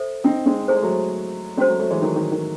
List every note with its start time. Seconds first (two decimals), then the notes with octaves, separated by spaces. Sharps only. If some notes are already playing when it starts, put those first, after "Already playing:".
Already playing: A4 C5 E5
0.24 C4 D#4
0.46 G#3 C4
0.68 A3 E4 G#4 C5
0.76 G#3
0.83 F#3 A3
1.57 G#3 C4 C#4 F#4 C5
1.68 F#3 A3
1.79 F#3 A3
1.91 E3 G#3
2.02 D#3 F#3
2.16 D#3
2.32 D#3